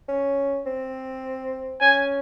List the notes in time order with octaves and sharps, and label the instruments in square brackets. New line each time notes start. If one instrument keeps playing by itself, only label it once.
[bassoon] C#4
C4
[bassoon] C#4 [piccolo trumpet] G#5